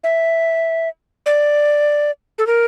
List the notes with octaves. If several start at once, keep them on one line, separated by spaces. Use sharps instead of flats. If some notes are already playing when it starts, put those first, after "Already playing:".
E5
D5
A4
A#4